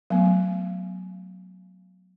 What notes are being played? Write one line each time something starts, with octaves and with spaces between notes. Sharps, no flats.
F#3 A3 B3